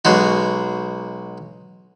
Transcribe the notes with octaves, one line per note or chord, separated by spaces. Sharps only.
B1 G#3 F#4